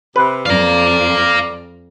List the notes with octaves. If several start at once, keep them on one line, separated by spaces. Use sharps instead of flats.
C3 B4
F2 D5 F5 A#5